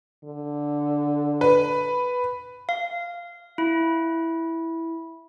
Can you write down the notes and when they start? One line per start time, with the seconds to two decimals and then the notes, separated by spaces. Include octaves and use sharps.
0.24 D3
1.41 B4
2.69 F5
3.58 E4